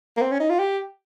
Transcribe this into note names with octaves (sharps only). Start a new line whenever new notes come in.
A#3
C4
C#4
D#4
F4
G4